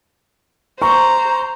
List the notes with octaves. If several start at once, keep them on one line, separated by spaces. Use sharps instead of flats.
C5 A#5 C#6